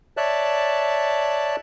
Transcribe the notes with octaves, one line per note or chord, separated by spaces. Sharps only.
C#5 D5 E5 A5 F#6